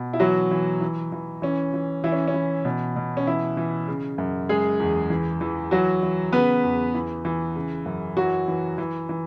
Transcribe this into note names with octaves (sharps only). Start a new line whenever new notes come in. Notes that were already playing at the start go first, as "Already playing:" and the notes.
Already playing: B2
E4
E3 F#3 F#4
E3
E3
E3
E3 C#4
E3
E3 E4
C#4
C#4
E3
B2
B2
C#4
E3 E4
E3
C#3
F#2
C#3 G#3 G#4
E2
E3
E3
E3 F#3 F#4
E3
C#3 B3 B4
E2
E3
E3
C#3
F#2
E3 F#3 F#4
E3
E3
E3